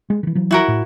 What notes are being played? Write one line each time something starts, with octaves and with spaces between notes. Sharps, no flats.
G#3
D#3 E3
E3 F#3
E4 F#4 A#4
A2